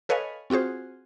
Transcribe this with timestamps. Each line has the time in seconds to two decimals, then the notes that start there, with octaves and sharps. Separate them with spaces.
0.09 A4 B4 C#5 D#5 F5 G#5
0.50 C4 F4 F#4 G#4 C5